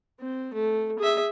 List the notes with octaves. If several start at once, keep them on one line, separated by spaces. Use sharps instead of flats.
C4
A3
G#4 E5